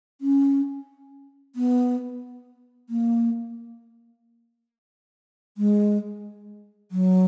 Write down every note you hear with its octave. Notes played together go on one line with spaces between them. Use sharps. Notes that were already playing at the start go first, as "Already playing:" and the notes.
C#4
B3
A#3
G#3
F#3